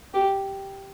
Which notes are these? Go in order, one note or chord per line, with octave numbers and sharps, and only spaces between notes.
G4